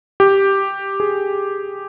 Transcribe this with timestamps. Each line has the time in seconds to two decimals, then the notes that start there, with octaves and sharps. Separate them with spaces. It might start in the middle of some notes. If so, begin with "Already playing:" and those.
0.20 G4
1.00 G#4